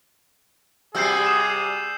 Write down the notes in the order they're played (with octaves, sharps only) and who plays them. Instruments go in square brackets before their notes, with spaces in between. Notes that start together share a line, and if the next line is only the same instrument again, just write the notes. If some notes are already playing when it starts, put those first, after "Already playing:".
[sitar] C3 G3 F#4 [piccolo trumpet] G#4 [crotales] E6 G6 C7
[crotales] D#6 E7